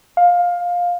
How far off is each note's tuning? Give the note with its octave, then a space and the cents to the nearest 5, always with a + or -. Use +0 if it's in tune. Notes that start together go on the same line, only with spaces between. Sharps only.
F5 +15